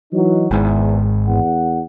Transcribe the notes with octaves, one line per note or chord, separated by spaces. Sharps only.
E3 F#3 D#4
G#1 E2 G#2
E2 F#5